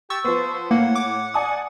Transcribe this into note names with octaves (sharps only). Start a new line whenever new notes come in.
G4 C#6 E6 A6
F3 B3 C5
C5
A2 A#3 F#5
D6
D5 G#5 D#6